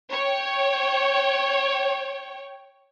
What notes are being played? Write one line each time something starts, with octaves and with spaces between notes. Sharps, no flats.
C#5 G5